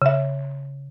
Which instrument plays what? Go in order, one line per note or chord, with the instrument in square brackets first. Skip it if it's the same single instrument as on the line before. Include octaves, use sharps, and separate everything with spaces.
[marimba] C#3 E5